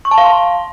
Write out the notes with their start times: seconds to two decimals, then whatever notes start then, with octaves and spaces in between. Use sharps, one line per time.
0.05 C#6
0.11 A5
0.18 F5
0.24 C6